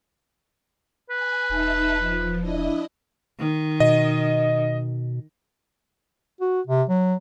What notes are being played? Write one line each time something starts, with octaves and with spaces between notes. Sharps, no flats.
B4 G#5
E1 D#4 E5 A5
F3
D4 E4 D#5
D#3
B2 D#5
F#4
C3
F#3